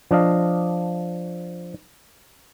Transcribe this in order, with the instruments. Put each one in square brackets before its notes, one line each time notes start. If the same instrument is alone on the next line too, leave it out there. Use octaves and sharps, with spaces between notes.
[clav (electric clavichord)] F3 D4 D#5 F5